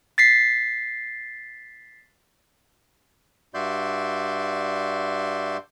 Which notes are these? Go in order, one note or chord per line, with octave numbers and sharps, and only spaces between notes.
A6 B6 C7
G2 F#4 D5 E5 C6 G6